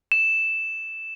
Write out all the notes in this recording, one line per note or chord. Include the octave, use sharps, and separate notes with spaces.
E7